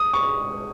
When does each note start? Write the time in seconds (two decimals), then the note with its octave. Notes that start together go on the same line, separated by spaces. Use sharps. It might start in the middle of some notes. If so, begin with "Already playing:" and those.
Already playing: D#6
0.13 C#6